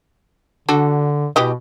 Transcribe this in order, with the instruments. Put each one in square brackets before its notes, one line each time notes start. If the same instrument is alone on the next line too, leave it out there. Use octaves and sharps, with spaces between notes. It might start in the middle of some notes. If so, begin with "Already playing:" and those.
[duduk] D3 [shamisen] D4 F#4 A4
[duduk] B2 [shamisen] E3 G4 D#5